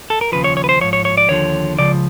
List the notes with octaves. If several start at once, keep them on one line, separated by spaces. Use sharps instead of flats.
A4
A#4
D#2 C#3 F3 B4
C#5
C#5
B4
C5
G#2 F3 C#5
C#5
C#5
D5
D#2 D3 F3 C#5
C#2 C#3 F3 D5